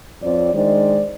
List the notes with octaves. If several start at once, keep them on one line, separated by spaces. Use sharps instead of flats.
F2 C4 C#5 D5
D#3 G#3 D4 C5 D5